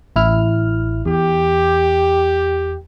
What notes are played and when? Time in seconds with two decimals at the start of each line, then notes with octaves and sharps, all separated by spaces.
0.16 A1 E4 F6
1.06 E2 G4